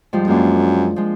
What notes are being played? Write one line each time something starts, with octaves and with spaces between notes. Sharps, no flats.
G#2 F3 G3
F#2 G#3 A#3 D4
F3 G#3